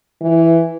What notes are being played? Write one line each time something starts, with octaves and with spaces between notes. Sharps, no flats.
E3